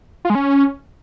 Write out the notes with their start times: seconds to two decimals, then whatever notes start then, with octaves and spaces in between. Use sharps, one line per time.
0.25 F4
0.30 G#3
0.35 C#4